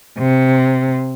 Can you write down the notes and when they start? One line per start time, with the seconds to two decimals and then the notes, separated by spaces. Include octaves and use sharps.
0.18 C3